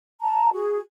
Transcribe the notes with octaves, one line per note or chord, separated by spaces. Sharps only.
A5 A#5
F#4 G#4